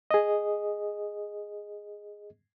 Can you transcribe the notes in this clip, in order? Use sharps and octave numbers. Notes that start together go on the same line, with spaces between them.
G#4 D#5